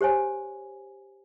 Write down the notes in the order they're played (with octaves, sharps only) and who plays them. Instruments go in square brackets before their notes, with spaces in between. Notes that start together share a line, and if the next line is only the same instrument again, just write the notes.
[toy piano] G4 C5 C#5 G#5